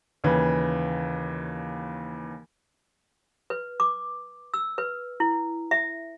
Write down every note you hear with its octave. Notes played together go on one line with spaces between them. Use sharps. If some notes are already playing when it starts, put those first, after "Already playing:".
D#2 C#3 E3
B4
D6
E6
B4
E4
E5